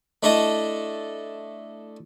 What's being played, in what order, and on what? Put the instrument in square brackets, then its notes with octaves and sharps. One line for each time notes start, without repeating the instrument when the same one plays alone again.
[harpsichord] A3 D4 E4 A4 D#5